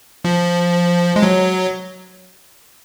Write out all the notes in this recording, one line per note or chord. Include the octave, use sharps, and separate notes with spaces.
F3
G#3
F#3